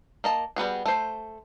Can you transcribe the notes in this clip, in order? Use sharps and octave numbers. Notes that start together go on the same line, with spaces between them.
A#3 D#5 A5
G3 B3 F#4 G#4
A3 C5